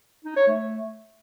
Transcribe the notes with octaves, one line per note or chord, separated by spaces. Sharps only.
D#4
C#5
A3